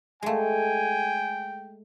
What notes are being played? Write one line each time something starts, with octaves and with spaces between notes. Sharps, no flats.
G#3 A3 G5 G#5